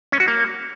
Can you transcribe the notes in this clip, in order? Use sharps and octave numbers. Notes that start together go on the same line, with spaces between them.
C#4
F#4
A#3